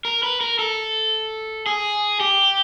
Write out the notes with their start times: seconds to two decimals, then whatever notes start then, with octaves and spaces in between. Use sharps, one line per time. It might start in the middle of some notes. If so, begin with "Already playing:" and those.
0.05 A#4
0.23 B4
0.41 A#4
0.59 A4
1.66 G#4
2.20 G4